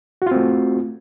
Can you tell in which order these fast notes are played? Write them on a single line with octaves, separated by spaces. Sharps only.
F#4 F4 C4 A3